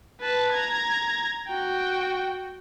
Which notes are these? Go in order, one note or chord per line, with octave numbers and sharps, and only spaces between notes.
B4 A5
A#5 G#6
F#4 G5